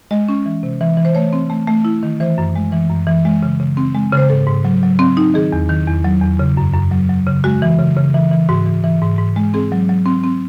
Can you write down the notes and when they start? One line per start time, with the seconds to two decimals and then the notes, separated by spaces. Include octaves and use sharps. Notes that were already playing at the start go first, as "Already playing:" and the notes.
0.11 G#3 D#5
0.29 C#4
0.46 E3
0.63 C3
0.81 E3
0.97 E3
1.05 C5
1.15 A3 C#5
1.33 C4
1.50 A3
1.67 A3
1.85 E4
2.03 D#3
2.20 E3 C5
2.38 F#2
2.56 G#3
2.72 E3
2.90 F#2
3.07 E3
3.25 G#3
3.43 C#3
3.60 C#3
3.77 C4
3.95 G#3
4.12 C#3 C5
4.30 G#2 A4
4.47 G#2
4.65 F#3
4.83 F#3
4.99 C4
5.17 D#4
5.34 D#3 G#4
5.52 E2
5.69 D#3
5.87 E2
6.04 F#3
6.22 E2
6.39 C#3
6.57 F#2
6.74 F#2
6.91 F#3
7.09 F#3
7.27 C#3
7.44 G#3 F#4
7.62 E3
7.78 C#3
7.96 C#3
8.14 E3
8.31 E3
8.49 G#2 F#4
8.66 E3
8.84 E3
9.02 G#2
9.18 G#2
9.36 G#3
9.54 C4 G#4
9.72 F#3
9.89 F#3
10.06 C4
10.24 C4